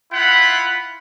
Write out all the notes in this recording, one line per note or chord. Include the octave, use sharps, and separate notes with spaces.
E4 F4 F#5 B5